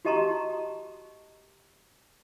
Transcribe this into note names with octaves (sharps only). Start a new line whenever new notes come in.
F#4 G4 D#5 A5 A#5 C6